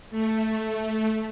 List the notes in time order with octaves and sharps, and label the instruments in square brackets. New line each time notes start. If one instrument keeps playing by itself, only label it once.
[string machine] A3